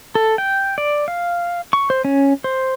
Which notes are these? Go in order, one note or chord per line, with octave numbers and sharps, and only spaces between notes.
A4
G5
D5
F5
C#6
C5
C#4
C5